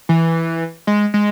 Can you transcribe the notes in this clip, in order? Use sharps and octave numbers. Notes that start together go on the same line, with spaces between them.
E3
G#3
G#3